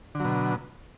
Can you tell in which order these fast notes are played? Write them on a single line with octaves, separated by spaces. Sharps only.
D3 F#3 B2